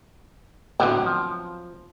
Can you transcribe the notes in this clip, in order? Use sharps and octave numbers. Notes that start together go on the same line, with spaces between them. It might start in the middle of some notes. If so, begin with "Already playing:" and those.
A2 D3 F#3 B3 C4
F3